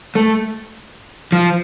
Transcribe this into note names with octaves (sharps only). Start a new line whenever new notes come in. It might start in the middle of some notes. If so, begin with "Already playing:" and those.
A3
F3